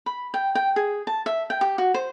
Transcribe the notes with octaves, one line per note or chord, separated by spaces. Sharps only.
B5
G5
G5
G#4
A5
E5
G5
G4
F#4
C5